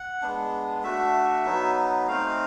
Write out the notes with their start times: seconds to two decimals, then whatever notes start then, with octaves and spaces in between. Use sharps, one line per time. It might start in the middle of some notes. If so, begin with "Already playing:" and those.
Already playing: F#5
0.22 G#3 B3 D4
0.83 A3 D4 F#4 E5
1.45 F#3 B3 D#4
2.08 A3 C4 D#4 F5